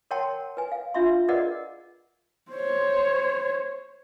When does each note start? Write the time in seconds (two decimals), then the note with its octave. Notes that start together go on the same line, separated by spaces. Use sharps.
0.11 A#4 C#5 F#5 G5 A5 C6
0.57 B4 G#5
0.72 F5
0.94 D4 F4 E5 F5 C6
1.28 G#4 A#4 B4 D5 D#5 F#5
2.52 C5 C#5